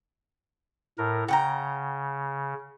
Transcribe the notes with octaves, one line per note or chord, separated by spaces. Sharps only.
A2 A#4
C#3 F#5 G5 A#5